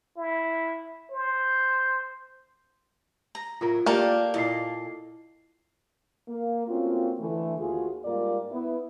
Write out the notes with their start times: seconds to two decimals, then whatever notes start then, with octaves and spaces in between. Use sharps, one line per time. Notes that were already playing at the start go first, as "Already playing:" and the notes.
0.17 E4
1.11 C5
3.35 A#5
3.61 A2 F#3 F4 A#4
3.86 A#3 G4 A4 A#4 D5 F5
4.34 A#2 A3 E4 F4 A4 D#5 C7
6.28 A#3
6.68 A3 A#3 C4 C#4 F4 F#4
7.19 D3 E3 A3
7.58 D#2 F4 F#4 G#4
8.05 G#2 G3 A#3 F4 A#4 D5
8.51 B3 E4